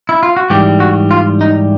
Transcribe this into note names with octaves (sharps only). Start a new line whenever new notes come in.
E4
F4
F#4
G#2 E3 G3 G4
F#4
F4
D#4